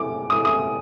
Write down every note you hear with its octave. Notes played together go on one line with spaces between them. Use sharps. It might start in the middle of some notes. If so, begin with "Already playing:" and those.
Already playing: D6
D#6
D#6